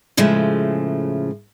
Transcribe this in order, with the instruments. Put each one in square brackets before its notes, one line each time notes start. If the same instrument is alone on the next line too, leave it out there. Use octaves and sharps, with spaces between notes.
[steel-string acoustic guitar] A2 C#3 F3 G#3 A3